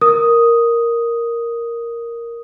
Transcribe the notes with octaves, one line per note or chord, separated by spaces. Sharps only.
A#4 D#6